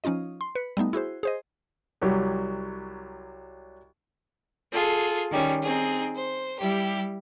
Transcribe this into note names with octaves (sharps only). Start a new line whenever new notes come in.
F3 C#4 D#4 F4 D#5
C6
B4 C#7
G3 A3 B3 D#4
E4 F#4 G#4 C5
G#4 C5 D#5
C2 F#3 G4
F4 G#4 A4
D#3 G3 C#4
C4 D#4 G#4
C5
G3 E4 G4